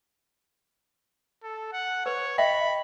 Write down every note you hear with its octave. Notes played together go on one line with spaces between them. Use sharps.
A4
F#5
B4 C#5
D#5 E5 G5 B5